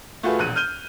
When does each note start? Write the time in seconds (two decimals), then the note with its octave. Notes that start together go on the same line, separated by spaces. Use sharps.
0.23 A3 F4 F#4 G#4 B4
0.39 E1 A#1 F#6 D#7
0.56 F6 G6 D#7 G7